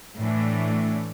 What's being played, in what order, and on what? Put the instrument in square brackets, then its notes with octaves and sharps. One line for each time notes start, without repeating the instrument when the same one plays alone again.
[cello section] A2 E3 A3 D4